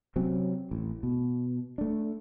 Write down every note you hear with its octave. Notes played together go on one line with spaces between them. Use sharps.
C3 F#3 C4 C#4
A1
B2
A3 D4